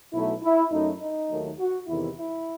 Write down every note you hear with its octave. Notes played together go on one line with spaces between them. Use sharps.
B1 B2 F#3 A3 E4
E4
F#2 F#3 A3 D#4
D#4
D#2 D#3 F#3 A3
F#4
E2 C3 D#3 E4
E4